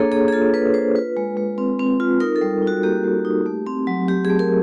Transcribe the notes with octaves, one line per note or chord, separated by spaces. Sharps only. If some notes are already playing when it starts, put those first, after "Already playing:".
Already playing: A#3 D4 G#4 A4 C#5
A#3 G#4
G#4
F4 A4
A#3 B4
F4 C5
F4 B4
G#3
G#3
C4
C4
F4
D#4 A#4
A4
G3
D#4 F#4
A#3 G4
G3
D#4
A3
C4
F#3
F#3 G4
G#4
A3
A#4